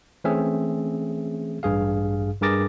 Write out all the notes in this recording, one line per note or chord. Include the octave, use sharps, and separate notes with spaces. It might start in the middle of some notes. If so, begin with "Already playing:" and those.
E3 A3 C4 C#4 G#4 E5
A1 G2 G#4 F5
G2 G#4 A#4 D6 A6 A#6